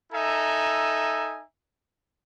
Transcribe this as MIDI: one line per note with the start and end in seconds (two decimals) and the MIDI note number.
0.12 1.42 63
0.12 1.42 69
0.12 1.42 76
0.12 1.42 80
0.12 1.42 82